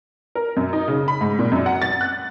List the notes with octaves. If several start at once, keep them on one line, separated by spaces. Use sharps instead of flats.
A#4
F#2
D#4
C#3
B5
G#2
A#2
F#2
F#5
A6
F#6